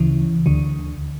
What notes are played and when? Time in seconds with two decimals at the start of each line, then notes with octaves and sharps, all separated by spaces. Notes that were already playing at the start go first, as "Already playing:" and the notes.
Already playing: D2 C#3 E3
0.46 D2 D3